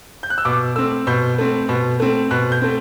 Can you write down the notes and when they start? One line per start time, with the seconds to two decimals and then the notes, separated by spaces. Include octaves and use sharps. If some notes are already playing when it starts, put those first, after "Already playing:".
0.23 G6
0.30 F#6
0.38 E6
0.45 B2 D6
0.76 A3 C4 E6
1.07 B2 G6
1.38 A3 C4
1.69 B2
2.00 A3 C4
2.31 B2 F#6
2.52 G6
2.62 A3 C4